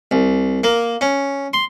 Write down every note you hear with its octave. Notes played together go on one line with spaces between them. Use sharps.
C2
A#3
C#4
C6